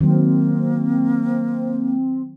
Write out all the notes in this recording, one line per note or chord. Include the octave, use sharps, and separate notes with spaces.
D#3 F#3 A#3 C4